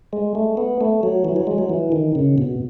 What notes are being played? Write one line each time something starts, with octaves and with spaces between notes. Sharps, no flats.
G#3
A3
B3
A3
F#3
E3
F#3
G#3
F#3
E3
D#3
C#3
B2